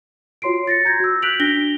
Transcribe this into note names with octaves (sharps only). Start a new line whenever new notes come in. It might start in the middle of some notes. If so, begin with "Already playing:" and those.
F4 F#4 C#5 C6 C7 D7
A6 A#6 C#7
A#5 G6 G#6 A#6
F#4 E6
F#6 G6 B6 D7 F7 F#7
D4 A#6 D7 G7